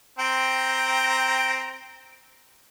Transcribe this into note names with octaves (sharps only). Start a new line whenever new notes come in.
C4 G5 A#5